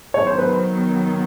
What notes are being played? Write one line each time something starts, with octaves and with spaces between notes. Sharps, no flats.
D#3 F#3 B3 C#5
C5
B4
C5